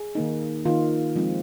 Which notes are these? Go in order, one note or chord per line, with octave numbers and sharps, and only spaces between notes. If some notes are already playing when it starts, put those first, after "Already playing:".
Already playing: G#4
D#3 A#3 D#4
D#3 A#3 D#4 F4
F3 G#3 C4 D#4